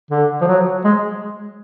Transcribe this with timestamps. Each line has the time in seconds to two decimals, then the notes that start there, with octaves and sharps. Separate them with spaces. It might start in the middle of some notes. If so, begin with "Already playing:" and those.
0.11 D3
0.41 F3
0.47 F#3
0.84 G#3